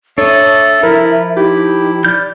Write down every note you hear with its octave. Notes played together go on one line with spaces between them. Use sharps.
D4 A4 C#5 E5 D#6
F3 E4 A#4
D#4 E4 G4
D5 F6 G6